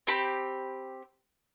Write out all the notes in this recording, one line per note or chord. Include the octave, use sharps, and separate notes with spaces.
C4 G4 B5